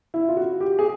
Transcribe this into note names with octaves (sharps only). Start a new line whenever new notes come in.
E4
F4
F#4
G4
G#4